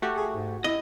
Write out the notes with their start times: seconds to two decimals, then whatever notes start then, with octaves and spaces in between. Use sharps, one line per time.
0.02 A3 F#4 G4
0.17 G#4
0.34 G#2
0.64 E4 D#5